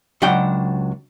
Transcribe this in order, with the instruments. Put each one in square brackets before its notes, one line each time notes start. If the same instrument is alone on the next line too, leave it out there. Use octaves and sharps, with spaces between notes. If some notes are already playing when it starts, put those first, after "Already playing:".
[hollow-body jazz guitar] C#2 F#3 D4 F#5 G5